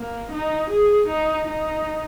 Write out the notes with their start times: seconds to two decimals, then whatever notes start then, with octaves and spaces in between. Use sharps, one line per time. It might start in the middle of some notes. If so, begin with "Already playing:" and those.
Already playing: A#3
0.32 D#4
0.70 G#4
1.08 D#4
1.47 D#4